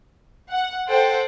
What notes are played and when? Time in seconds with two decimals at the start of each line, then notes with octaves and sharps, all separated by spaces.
0.51 F#5
0.88 A4 C5 F#5 G5